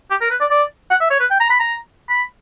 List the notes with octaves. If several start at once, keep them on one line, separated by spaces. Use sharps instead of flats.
G4
A#4
B4
D5
D5
F#5
E5
C#5
B4
G5
A#5
B5
A#5
B5